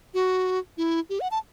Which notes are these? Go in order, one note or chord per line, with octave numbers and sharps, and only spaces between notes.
F#4
E4
G4
F#5
A5